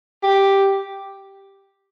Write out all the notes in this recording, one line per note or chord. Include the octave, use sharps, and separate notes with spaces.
G4